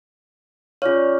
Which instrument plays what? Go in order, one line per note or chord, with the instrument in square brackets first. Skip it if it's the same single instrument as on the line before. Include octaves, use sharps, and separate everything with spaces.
[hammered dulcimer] C#3 D5 F5 [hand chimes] F4 C#5